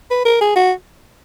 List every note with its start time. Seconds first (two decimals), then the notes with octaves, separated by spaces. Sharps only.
0.11 B4
0.25 A#4
0.41 G#4
0.56 F#4